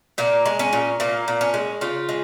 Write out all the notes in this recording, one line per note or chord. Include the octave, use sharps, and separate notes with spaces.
A#2 A#3
G#3
C#4
A#2
A#2 A#3
A#2
C#4
G#3
C#3 F4
G#3